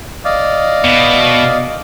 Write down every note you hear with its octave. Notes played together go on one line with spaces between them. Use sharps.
D5 D#5 F5
B2